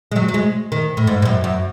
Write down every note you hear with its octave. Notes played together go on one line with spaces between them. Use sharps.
G#3
F#3
F#3
G#3
D#3
A2
G#2
G#2
F#2
F#2